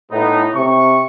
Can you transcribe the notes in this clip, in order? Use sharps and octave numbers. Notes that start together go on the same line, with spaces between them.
A2 B3 D#4
C3 C#6